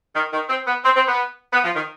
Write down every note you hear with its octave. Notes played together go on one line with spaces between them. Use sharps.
D#3
D#3
C4
B3
C4
C4
B3
B3
F3
D#3